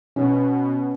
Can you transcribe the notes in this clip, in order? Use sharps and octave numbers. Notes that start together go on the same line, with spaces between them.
B2 C#4